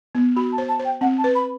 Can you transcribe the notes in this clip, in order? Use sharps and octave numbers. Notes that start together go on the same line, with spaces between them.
B3
F#4 B5
A5
C5
A5
C5
G5
C4 F#5
A5
B4
B5